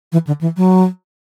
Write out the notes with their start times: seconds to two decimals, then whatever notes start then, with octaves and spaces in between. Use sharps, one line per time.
0.12 E3
0.27 D3
0.41 E3
0.57 F#3